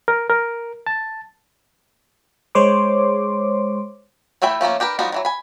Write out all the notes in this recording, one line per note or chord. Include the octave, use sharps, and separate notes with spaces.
A#4
A#4
A5
G#3 C5 C#5 C6 D6
E3 A3 E5 G5 B5
F3 A3 A#3 C#4
D4 G4 A#4 B4
F3 G3 D4 D#4 F#4
D#3 E3 F#3
G#5 B5